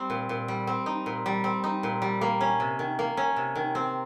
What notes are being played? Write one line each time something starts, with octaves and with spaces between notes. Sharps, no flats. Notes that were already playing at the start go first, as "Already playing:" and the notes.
Already playing: G3 C4
A#2
A#2
G3
C4
D#4
A#2
G3
C4
D#4
A#2
G3
A#3
C#4
C3
D#3
A#3
C#4
C3
D#3
C4